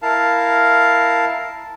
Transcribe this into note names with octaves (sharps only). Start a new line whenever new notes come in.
E4 A#4 F5 A5